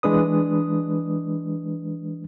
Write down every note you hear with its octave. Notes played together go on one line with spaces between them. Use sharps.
E3 G#3 D4 B4 D#6